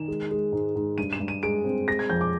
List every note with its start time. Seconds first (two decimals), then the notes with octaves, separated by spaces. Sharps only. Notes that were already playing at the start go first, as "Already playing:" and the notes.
Already playing: D#3 E7
0.08 G#3
0.31 G#3
0.52 G#2
0.75 G#2
0.98 G2 D#7
1.13 E7
1.20 G2
1.28 D#7
1.43 G#3 D7
1.65 C4
1.88 G#3 A#6
1.99 G#6
2.10 F2 G6
2.21 D6